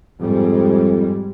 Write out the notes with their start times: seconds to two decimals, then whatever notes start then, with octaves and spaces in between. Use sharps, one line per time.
0.20 F2 G#2 G3 G#3